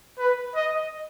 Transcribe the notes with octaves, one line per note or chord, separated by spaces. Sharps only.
B4
D#5